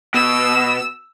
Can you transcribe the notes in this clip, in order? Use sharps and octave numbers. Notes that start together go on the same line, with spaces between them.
B2 E6